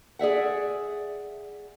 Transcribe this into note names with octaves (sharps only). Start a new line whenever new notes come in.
G#4 D5 E5 F#5